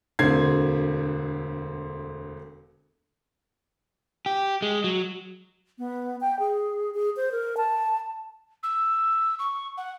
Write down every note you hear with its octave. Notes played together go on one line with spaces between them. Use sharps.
E1 D2 D3 C4 G#6 C7
G4
G#3
F#3
B3
G5
G#4
G#4
C5
A#4
A5
E6
C#6
F#5